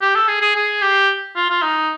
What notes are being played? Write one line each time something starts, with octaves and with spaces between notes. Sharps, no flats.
G4
A4
G#4
G#4
G#4
G4
F4
F4
D#4